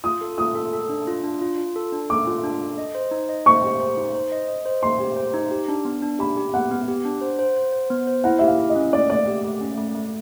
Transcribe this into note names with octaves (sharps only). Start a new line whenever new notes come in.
F4 D#6
A4
F4 D#6
A4
A4
D4
F4
D4
F4
F4
A4
D4
A4 D6
F4
D4
A4
D#5
C5
D#4
D#5
C5 C#6
G4
C5
D#4
C5
D#5
D#5
C5
C5 C6
G4
C5
D#4
G4
D4
B3
D4
G4 B5
G4
B3 F#5
B3
G4
D4
C5
C5
C5
C5
B3
C5
E4 F#5
G4 E5
F5
E4
D#5
C#4
A3 D5
A3 D5
G4
A3
C#4
A3
A3